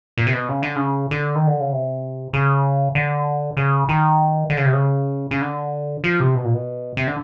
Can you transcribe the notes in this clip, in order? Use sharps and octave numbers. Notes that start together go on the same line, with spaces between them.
A#2
C3
B2
C#3
D3
C#3
D3
D#3
D3
C#3
C3
C#3
D3
C#3
D#3
D3
C#3
C3
C#3
C#3
D3
F3
C3
B2
A#2
B2
C3
D3